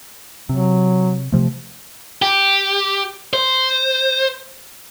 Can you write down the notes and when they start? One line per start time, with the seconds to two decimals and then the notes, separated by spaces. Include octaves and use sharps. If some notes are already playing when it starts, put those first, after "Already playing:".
0.49 C3 F#3
1.32 C3 F3 A3
2.22 G4
3.33 C5